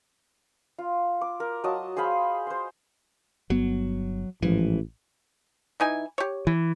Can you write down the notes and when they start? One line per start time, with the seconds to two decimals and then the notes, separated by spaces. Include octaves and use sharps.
0.79 F4
1.21 D6
1.40 A#4
1.64 F#3 D#5 A5 D#6
1.97 G#4 C5 F5 B5
2.47 C5 C6
3.50 G1 F#3 B3
4.42 A1 G#2 E3 F3
5.80 E3 D#4 G#5
6.18 G4 C#5
6.47 E3